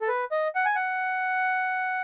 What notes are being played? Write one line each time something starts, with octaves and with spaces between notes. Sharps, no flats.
A4
B4
D#5
F#5
G#5
F#5